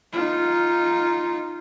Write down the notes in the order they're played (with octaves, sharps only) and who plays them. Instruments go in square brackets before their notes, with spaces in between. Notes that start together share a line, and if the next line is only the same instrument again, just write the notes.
[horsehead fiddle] D#4 F4